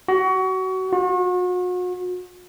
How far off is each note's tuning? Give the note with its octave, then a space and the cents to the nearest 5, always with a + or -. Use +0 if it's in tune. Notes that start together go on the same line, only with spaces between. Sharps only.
F#4 +25
F#4 -40